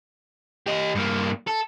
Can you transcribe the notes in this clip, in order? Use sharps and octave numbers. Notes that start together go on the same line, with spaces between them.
G4 D#5
G2 A#3
A4